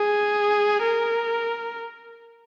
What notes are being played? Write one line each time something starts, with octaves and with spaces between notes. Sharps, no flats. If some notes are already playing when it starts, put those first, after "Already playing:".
Already playing: G#4
A#4